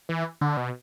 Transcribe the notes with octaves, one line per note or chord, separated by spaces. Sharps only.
E3
D3
B2